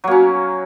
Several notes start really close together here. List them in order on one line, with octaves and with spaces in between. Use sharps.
F#3 A#3 C#4